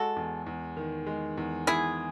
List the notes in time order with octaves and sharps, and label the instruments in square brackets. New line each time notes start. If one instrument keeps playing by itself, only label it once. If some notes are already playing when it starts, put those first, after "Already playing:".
Already playing: [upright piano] G#3 [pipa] F#4 A4
[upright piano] E2
E2
D#3
G#3
E2
[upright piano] E2 [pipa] E4 G#4